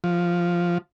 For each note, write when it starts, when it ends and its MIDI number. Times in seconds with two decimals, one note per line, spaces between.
0.04 0.78 53